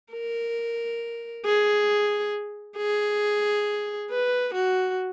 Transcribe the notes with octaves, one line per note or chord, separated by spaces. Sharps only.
A#4
G#4
G#4
B4
F#4